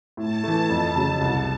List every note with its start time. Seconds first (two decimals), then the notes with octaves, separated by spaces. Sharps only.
0.17 A2 A5
0.44 E3 A3
0.69 F2 A5
0.95 C#3 F#3
1.21 C2